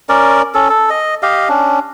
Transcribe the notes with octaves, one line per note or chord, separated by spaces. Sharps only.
C#4 A#4 D5
C#4 A4
A4
D#5
G4 D#5 F5
C#4 D4